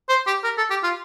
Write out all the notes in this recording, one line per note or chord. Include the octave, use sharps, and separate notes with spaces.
C5
G4
A#4
A4
G4
F4